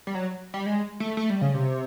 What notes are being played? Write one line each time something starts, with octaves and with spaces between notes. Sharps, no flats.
G3
F#3
G3
G#3
A3
A3
G3
C#3
C3